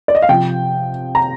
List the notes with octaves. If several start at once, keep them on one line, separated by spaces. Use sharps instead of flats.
D5
D#5
F5
C3 F3 G5
A#5